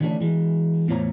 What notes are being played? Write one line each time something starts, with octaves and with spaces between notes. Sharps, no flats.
D3 E3 G3 A3 C#4 D4
E3 G#3
E2 A2 F4 C5 C#5 A#5